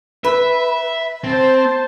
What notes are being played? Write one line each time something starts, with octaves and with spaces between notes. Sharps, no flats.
B4 E5
C4 C5 A5